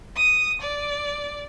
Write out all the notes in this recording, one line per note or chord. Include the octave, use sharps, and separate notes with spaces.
D#6
D5